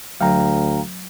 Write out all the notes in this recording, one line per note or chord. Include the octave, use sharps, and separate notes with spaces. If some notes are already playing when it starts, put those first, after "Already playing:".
D2 F#3 F5 G5 A#5